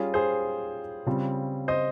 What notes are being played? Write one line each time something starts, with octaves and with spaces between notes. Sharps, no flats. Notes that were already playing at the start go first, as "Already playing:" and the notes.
Already playing: G3 C#4 F4 G#4
G#4 C5
C#3 G3 C4 F4
C5 D#5